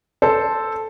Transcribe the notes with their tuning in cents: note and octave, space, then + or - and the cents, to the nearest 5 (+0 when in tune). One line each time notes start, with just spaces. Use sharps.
A4 +0 C5 +0